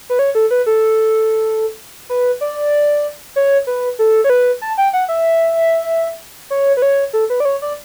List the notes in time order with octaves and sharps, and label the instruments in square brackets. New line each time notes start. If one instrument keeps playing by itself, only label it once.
[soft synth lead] B4
C#5
A4
B4
A4
B4
D5
C#5
B4
A4
C#5
B4
A5
G5
F#5
E5
C#5
B4
C#5
A4
B4
D5
C#5
D5